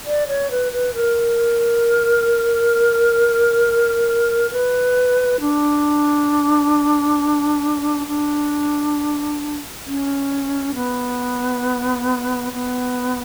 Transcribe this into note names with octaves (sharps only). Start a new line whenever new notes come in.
D5
C#5
B4
B4
A#4
B4
D4
D4
C#4
B3
B3